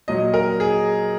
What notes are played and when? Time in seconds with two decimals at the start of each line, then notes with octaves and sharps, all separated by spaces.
0.08 A#2 F#3 D#5
0.34 A#4
0.60 G#4